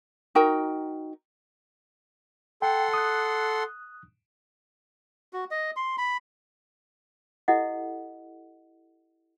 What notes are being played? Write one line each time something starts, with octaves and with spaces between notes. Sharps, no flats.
D#4 F#4 A#4 G5
A4 F#5 G5 C6
D#6 F#6
F#4
D#5
C6
B5
E4 G4 A4 D#5 F#5